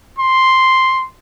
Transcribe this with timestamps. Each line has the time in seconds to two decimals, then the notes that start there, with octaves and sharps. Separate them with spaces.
0.18 C6